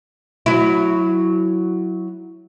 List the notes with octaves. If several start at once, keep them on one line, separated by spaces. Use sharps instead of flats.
F#3 E4